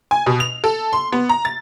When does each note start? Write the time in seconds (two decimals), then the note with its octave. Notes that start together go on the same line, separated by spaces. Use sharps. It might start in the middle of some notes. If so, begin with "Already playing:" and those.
0.11 G#5
0.26 B2
0.40 F7
0.64 A4
0.93 C6
1.12 B3
1.29 A#5
1.45 A6